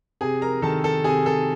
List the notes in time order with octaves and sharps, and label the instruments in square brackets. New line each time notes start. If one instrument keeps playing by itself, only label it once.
[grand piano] C3 G#4 G#5
A#4 A#5
D#3 A4 A5
A4 A5
C3 G#4 G#5
A4 A5